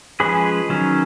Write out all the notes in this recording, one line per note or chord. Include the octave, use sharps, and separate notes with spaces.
F3 G#3 C#4 G#4 B4
D#3 F#3 C#4